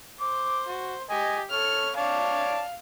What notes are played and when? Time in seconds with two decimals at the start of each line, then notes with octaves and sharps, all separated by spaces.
0.21 C5 D6
0.68 F#4
1.10 G4 D#5 G#5
1.51 A4 C#5 F6
1.97 C#5 D5 F5 A5